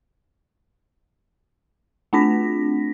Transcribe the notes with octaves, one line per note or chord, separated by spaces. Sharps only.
A3 C4 D4 F4 A#6 B6